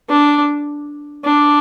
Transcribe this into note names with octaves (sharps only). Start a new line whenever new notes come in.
D4
D4